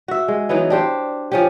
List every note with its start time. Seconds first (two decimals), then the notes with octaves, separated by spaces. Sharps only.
0.08 F#4 E5
0.28 G#3
0.49 E3 F#3 B3 D#4
0.70 D4 G4 C5
1.32 F3 C#4 G4